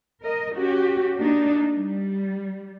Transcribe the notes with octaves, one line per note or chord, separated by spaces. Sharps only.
A#4 D#5
C#4 F#4 G4
A#3 D4 D#4
G3